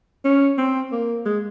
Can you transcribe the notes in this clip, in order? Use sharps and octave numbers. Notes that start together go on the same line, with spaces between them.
C#4
C4
A#3
G#3